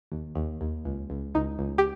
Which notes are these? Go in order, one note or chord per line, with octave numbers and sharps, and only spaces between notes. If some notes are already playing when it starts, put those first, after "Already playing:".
D#2
D#2
D#2
C#2
C#2
C#2 D#4
C#2
G4